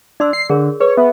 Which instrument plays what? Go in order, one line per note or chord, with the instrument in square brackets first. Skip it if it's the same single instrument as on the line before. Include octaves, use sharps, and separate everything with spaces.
[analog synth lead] D4 [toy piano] D5 C6 E6
[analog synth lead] C7
[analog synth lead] D3 [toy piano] G#4 A#4 C#5
[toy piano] G#4 B4 [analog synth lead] C#5
[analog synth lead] B3 [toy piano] E5